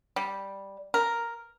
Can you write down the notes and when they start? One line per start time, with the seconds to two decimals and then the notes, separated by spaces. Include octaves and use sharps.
0.16 G3
0.94 A#4